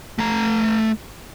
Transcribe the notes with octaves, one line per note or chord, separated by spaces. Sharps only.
A3 A#5